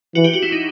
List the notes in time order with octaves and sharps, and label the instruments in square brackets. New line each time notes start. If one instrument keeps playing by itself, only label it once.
[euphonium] E3 [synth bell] F#4
[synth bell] G4
F#4
E4
D#4